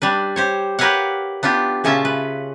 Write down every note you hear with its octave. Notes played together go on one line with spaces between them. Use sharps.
G3 D4 B4
G4 C5 C#5
G4 A#4 B4 C#5 F5 F#5
B3 D4 F4 G4
A#2 C#3 C#4 F4 E5 A5
B4